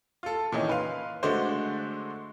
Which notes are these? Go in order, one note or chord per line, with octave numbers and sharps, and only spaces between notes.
F4 A4
A#2 D#3 E3 C#4 D#4
B4 F5 C6
D3 G#3 A3 D4 F#4 C5